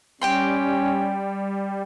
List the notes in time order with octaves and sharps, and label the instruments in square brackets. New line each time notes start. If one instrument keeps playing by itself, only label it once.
[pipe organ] G3 [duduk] C#4 [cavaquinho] G4 G5 C6